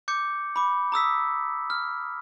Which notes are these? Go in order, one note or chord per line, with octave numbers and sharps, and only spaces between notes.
D6 G6 C#7
B5 D6
A#5 D#6 E6 B6
F6